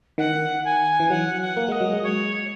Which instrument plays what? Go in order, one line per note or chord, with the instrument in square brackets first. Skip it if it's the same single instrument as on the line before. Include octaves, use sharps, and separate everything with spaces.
[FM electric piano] D#3 [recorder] F#5
[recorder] G#5
[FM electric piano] E3
[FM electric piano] F#3 [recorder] F#5
[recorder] F#5
[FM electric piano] A#3
[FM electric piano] G#3 [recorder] D#5
[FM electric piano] F#3
G#3
[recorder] C#5